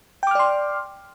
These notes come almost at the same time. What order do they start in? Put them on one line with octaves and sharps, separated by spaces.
G5 D6 F6 D5 C6